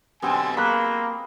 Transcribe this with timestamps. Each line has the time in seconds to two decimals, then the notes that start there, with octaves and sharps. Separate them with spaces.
0.22 F#2 B2 D3 B3 C4 G4 G#5
0.57 F#3 G#3 A#3 B5 F#6